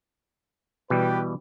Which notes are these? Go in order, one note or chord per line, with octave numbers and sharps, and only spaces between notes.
B2 E3 G3 G4 B4